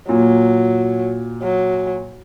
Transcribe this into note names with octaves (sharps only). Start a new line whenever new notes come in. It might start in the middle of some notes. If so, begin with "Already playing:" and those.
A#2 F#3
F#3